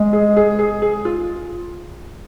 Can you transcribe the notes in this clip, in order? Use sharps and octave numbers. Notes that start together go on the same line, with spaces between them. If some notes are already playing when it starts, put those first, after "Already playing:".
Already playing: G#3
G#4
G#4
G#4
G#4
F4